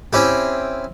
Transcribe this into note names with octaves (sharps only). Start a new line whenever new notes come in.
C4 C#4 E4 G4